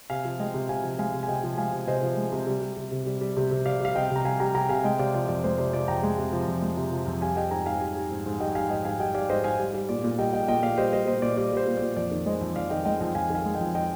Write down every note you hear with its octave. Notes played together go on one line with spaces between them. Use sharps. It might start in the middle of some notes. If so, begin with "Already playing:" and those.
C3 F5 G#5
F3
G#3 D#5 G5
C3
C3 F5 G#5
F3
G#3 F5 G#5
C3
G#5
C3 D#5 G5
F3
G#3 F5 G#5
C3
C3 C5 D#5
F3
G#3
C3
G3
G3
C3
C3
G3
G3
C3
C3
G3 D5 F5
G3 F5
C3 D#5 G5
C3
A#5
G3 F5 G#5
G3 G5 A#5
C3 G5 A#5
C3 F5 G#5
G#3 D#5 G5
C3 D5 F5
F3 D5
F2 D5
G#3 C5
C3 D5
F3 D5
F2 G5 A#5
G#3
C3
F3
F2
G#3
C3
F3
F2
G3 F5 G#5
G3 D#5 G5
G#2 G5 A#5
G#2 F5 G#5
G3
G3
G#2
G#2
G3 D#5 G5
G3 F5 G#5
G#2 D#5 G5
G#2 F5 G#5
G3 D#5 G5
G3 D5 F5
G#2 C5 D#5
G#2 F5 G#5
G3
G3
A#2 D5
A#2
G3 D#5 G5
G3 D#5 G5
A#2 D#5 G5
A#2 D5 F5
G3 C5 D#5
G3 C5 D#5
A#2 C5 D#5
A#2 D5
G3 D5
G3 C5
A#2
A#2 D5
F2 D5
D#3
G#3 C5 D#5
F2
F2 D5 F5
D#3 D#5 G5
G#3 D#5 G5
F2 D#5 G5
F2 F5 G#5
D#3 F5 G#5
G#3
F2 D#5 G5
D#5 G5